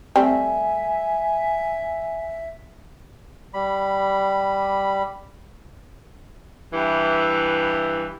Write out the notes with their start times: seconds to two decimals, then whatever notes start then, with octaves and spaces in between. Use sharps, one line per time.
0.16 G3 A3 C4 E5 G#5
3.54 G3 B5
6.73 G2 E3